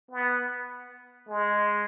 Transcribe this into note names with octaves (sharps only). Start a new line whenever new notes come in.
B3
G#3